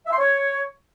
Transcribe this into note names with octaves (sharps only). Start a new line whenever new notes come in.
E5
C6
C#5